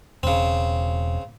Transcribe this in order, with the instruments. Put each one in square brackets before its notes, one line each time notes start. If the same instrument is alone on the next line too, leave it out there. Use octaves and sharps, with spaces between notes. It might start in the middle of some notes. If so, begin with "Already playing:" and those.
[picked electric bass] E1 [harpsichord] C#3 C4